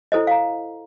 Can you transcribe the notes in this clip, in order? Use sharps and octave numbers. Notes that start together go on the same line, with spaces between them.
E4 A4 C5 D#5
F5 A#5